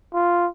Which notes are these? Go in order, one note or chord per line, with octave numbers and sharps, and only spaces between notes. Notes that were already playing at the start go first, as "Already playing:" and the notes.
F4